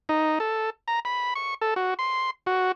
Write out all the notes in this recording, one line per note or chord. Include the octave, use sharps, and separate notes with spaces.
D#4
A4
A#5
B5
C#6
A4
F#4
C6
F#4